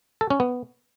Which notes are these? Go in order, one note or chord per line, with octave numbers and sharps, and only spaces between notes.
A4
C#4
B3